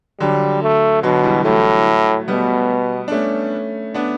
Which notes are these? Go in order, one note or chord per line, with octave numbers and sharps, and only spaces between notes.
D3 F#3 G3
A3
B2 D3 F#3
E3 G3
A2 F#3 A3
B2 G3 B3
D4
A3 C#4
B3 D4